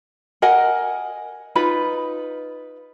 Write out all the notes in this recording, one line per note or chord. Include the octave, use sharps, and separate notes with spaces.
A#4 D#5 F#5 G#5
D#4 F4 B4 B5